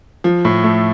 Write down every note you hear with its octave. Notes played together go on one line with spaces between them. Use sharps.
F3
A2
A3